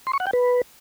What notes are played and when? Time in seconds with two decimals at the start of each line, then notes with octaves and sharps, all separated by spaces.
0.07 C6
0.13 C#6
0.20 F#5
0.27 G5
0.33 B4